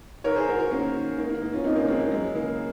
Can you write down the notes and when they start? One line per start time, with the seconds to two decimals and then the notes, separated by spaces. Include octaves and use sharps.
0.24 D#3 A#4 C#5
0.36 G#4 C5
0.47 G#2 F#4 A#4
0.60 F#4 A#4
0.71 D#3 A#3 C#4
0.94 D#3
1.18 G#2 A#3
1.29 A#3
1.41 G#2 A#3
1.53 C#4 F4
1.64 G#2 C4 D#4
1.76 A#3 C#4
1.88 G#2 G#3 C4
2.00 A#3
2.12 F#2 G#3
2.34 C#3 A#3